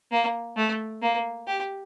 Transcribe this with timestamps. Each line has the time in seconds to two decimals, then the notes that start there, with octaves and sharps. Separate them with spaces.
0.12 A#3
0.57 A3
1.02 A#3
1.48 G4